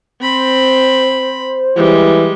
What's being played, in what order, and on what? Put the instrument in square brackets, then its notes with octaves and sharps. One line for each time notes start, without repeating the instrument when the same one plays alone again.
[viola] C4 B5 [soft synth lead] C5
[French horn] E3 [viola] G3 G#3